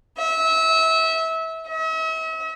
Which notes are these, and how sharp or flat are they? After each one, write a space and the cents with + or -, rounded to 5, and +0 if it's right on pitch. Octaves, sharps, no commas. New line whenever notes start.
E5 -25
E5 -45